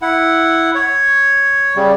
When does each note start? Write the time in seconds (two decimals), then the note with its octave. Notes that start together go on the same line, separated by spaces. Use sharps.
0.02 E4 F#5
0.75 C#5
1.76 C#3 G3